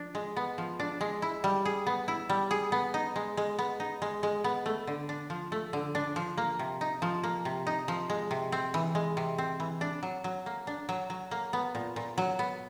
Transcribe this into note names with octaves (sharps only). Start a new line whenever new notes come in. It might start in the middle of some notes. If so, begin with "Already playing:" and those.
Already playing: F3 D4
G#3
B3
F3
D4
G#3
E4
G3
G#4
B3
E4
G3
G#4
B3
D#4
G#3
G#3
B3
D#4
G#3
G#3
B3
A3
D3
D4
F3
A3
D3
D4
F3
A#3
C3
D#4
F3
A#3
C3
D#4
F3
G#3
C3
C4
E3
G#3
C3
C4
E3
D4
F#3
F#3
A#3
D4
F#3
F#3
A#3
B3
A#2
A#2
F#3
B3